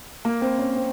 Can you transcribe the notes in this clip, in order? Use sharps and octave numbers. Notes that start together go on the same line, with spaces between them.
A#3
C4
C#4
C4